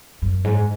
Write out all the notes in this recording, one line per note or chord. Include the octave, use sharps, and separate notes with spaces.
F#2
G#2